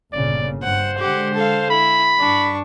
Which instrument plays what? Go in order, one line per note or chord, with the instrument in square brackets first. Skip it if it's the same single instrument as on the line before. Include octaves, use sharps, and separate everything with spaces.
[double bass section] G1 A#2 C#3 [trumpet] D5
[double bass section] G2 [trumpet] C5 [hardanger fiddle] F#5
[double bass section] D3 G#3 [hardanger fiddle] G4 F#5
[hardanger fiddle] A4 F5
[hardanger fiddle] E4 [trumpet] B5
[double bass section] G2 [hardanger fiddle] D4 C#6